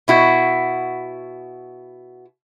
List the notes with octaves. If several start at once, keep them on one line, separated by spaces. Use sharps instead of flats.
B2 E4 F#4